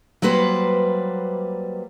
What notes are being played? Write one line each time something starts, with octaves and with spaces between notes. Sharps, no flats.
F#3 G3 A#3 B4 C5